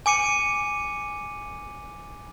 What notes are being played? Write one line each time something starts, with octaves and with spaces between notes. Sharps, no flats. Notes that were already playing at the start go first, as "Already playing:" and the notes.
G#5 D6 C#7 D#7